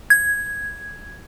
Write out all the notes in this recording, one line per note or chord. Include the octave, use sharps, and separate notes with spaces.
G#6